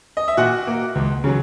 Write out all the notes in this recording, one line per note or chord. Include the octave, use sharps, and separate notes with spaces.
D#5
E5
A#2 F#4 F#5
A#3
C#2
C#3 F#3